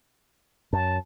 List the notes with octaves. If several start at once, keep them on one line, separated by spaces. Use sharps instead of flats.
F#2 A5